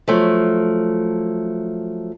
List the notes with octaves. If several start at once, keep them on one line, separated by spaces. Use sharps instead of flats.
F3 F#3 A3